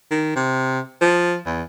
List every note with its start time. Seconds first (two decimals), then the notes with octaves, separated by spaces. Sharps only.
0.11 D#3
0.36 C3
1.01 F3
1.46 E2